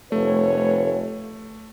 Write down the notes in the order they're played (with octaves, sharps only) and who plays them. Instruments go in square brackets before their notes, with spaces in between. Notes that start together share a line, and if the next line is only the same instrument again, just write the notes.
[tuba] F1 [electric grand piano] A3 [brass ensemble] B4 C#5